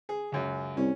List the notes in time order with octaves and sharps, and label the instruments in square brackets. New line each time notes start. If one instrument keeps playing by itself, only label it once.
[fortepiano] G#4
C#2 F#2
[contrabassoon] C2 [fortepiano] C#4